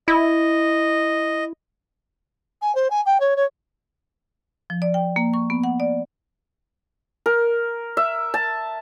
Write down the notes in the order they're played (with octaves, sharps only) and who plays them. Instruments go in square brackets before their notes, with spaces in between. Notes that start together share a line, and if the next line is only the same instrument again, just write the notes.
[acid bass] E4 [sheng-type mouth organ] D#5
[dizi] G#5
C5
G#5
G5
C#5
C#5
[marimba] F3
D5
G5
A#3
C#6
B3
F#5
D5
[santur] A#4
E5
A5